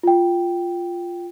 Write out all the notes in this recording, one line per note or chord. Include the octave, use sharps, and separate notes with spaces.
F4 G5